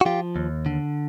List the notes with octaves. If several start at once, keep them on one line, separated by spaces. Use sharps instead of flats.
F#4
F3 F4 G4
D#2
D3